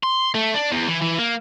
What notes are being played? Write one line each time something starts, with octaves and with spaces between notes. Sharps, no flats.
C6
A3
D4
E2
E3
E3
A#3